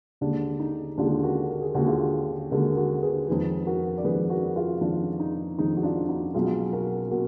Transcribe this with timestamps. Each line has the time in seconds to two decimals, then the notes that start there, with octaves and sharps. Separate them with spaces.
0.21 D#2 D3 G#3 D4
0.60 D#4
0.98 D#2 D3 G#3 D4 F4
1.23 F#4 A#4
1.49 A#4
1.62 G#4
1.74 D#2 D3 G#3 F#4
1.87 F4 G#4
2.51 D#2 D3 G#3 F#4 A#4
2.77 F#4 A#4
3.02 G#4 B4
3.28 F2 D#3 G#3 G#4 B4
3.67 F#4 A#4
3.98 D5
4.05 F2 D#3 G#3 G#4 B4
4.30 F#4 A#4
4.56 F4 G#4
4.81 F2 D#3 G#3 D4 F4
5.20 D#4
5.58 F2 D#3 G#3 D#4
5.77 F#4
5.83 D4 F4
6.08 D#4 F#4
6.34 B1 B2 G#3 F4 G#4
6.73 F#4 A#4
7.11 B2 F#4 A#4